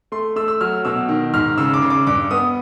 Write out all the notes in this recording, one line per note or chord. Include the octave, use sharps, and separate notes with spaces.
A3 C6
A3 E6
E6
F#3 F6
B2 E6
D#3
G#2 F6
C#3 E6
D6
C#3
D6
G2 D6
B3 D#6